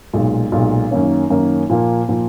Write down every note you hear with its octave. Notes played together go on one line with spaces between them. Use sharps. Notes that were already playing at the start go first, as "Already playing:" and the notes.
B1 A#2 G#3
B1 A#2 G#3
F#2 D#3 A#3 C#4
F#2 D#3 A#3 C#4
A#2 F3 A#3
A#2 F3 A#3